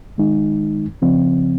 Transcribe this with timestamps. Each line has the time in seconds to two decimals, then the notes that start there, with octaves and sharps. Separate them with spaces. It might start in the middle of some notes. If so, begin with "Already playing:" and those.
0.18 D#3 G#3 D#4
1.02 C#3 F3 C4